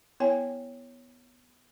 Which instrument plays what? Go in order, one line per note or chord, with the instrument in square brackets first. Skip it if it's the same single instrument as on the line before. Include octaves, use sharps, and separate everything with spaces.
[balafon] B3 E4 C#5 G5 G#5